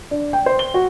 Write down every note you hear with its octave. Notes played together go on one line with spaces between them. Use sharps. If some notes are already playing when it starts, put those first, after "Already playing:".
D4
G5
C5
G7
F#4